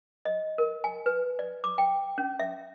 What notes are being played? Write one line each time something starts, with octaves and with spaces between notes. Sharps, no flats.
D#5
A#4
G#5
B4
D5
D6
G5
C#4
E5